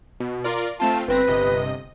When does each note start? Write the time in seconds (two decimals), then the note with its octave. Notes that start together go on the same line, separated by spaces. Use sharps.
0.20 B2
0.44 F4 A#4 D5
0.80 A3 C4 F4 A5
1.08 G1 C4 B4 A#6
1.28 G1 C3 D#5